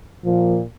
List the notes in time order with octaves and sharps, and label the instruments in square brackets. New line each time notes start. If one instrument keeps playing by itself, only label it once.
[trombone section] A#2 F3 A#3